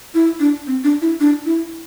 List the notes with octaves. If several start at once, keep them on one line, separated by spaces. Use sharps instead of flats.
E4
D4
C4
D4
E4
D4
E4